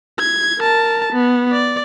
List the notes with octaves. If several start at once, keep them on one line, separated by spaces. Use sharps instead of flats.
G#6
A#4 A5
B3
D5